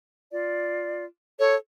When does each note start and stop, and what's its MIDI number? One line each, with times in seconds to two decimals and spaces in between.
0.32 1.04 65
0.32 1.04 74
1.39 1.56 69
1.39 1.55 73